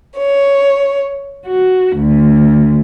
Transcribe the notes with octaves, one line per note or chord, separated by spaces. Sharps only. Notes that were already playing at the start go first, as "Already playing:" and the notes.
C#5
F#4
D2